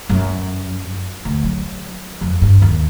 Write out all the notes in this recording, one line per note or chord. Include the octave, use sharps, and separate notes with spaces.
F#2
D2
F#3
F2
G2
D#2